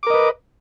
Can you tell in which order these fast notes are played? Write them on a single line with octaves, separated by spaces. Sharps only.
D6 A#4 D#5 B4